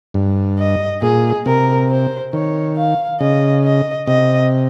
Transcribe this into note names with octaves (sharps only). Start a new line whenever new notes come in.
G2
D#5
A#2 G#4
C3 A#4
C5
D#3 C#5
F5
C#3 D#5
D#5
C3 D#5